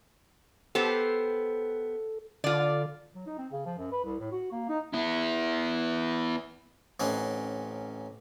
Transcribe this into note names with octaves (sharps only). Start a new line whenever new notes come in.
B3 G4 A4 C5
D3 F4 D5
F#3
D#4
C4
C#3
F3
F#2
B4
C2
A2
F#4
A#3
D#4
B3 E4
A1 C4 C#4 D#4 F#5